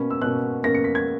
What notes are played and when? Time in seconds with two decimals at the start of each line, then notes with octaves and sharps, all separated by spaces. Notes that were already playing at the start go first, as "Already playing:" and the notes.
Already playing: B2 A#3 C#4 B5
0.10 E6
0.22 B2 A#3 C#4 F#6
0.63 B2 A#3 C#4 A#6
0.75 C#7
0.84 B6
0.95 G#6